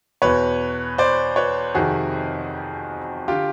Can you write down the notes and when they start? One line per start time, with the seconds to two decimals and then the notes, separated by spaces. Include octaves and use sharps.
0.22 E2 B2 B4 C#5
0.98 C5 D5
1.36 B4 C#5
1.74 F2 C3 D#3 F#4 G#4
3.28 D3 F4 G4